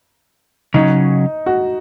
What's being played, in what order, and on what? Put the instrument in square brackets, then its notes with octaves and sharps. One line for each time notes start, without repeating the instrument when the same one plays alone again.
[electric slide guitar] C#3 F#3 C#4 [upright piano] D#4
[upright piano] F#4